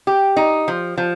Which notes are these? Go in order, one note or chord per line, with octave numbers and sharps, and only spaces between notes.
G4
D#4
F3
F3